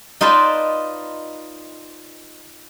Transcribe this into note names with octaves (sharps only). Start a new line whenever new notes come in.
D#4 F4 B4 C5 D5 A5